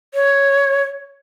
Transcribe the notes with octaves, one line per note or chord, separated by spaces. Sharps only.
C#5